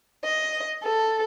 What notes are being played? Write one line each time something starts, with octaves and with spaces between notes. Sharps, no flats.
D#5
A4